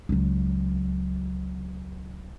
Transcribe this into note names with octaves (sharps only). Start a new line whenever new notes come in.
C#2 F#3